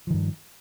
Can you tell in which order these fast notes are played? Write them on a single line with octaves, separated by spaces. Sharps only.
F3 D#3 G2